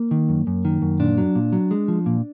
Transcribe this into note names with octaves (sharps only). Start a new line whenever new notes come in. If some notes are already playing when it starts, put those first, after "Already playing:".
Already playing: A#3
D#3
F#2
F#2
D#3
F#2
A#2 D4
F#3
A#2
F#3
G#3
F3
A#2